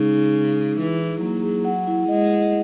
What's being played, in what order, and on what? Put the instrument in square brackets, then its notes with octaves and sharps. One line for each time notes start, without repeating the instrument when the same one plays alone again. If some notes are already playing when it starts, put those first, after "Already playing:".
Already playing: [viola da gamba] C#3 [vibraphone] G#3 D#4
[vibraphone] D#4
D#4
D#4
[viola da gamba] E3 [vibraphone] G#4
[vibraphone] E4
[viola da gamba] F#3 [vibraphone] A#3
[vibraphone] G#4
F#5
E4
[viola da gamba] G#3 [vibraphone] D#5
[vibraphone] D#5